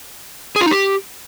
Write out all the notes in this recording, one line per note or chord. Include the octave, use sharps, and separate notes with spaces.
G#4
F4
D#4
G4